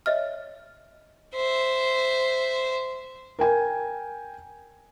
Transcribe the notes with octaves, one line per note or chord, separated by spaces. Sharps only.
C#5 D#5 E5 F6
C5 E5
A#4 G5 G#5